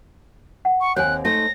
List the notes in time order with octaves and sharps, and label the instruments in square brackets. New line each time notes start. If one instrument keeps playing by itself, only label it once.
[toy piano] F#5
[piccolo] C#6
[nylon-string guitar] D#2 C4 G4 [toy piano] C#5 G#5 [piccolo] F#6
[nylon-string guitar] A3 D#4 C5 [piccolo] A#6